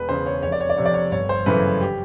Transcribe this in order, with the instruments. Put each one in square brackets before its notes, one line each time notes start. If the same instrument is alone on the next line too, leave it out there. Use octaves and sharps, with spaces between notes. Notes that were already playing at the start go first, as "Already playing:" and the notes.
Already playing: [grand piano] E1 B4
E2 C#3 C5
C#5
F1 C#5
D5
C#5
D5
F2 C3 C#5
D5
C#5
G1 C#5
C5
F#2 C#3 E3 A3 B4
G4